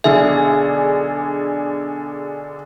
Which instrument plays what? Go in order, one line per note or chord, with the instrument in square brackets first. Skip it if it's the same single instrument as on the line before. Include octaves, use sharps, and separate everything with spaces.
[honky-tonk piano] B1 D3 G#4 [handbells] E5